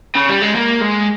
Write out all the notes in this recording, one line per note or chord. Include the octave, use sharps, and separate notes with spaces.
C#3
G3
G#3
A#3
G#3